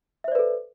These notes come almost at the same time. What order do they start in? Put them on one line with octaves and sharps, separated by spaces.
E5 C5 D5 B4 A4